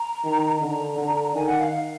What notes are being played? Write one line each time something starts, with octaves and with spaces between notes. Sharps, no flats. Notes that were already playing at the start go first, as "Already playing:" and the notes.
Already playing: A#5
D#3
D3 A#5
D3
D#3 G#5
F#5
F5
F5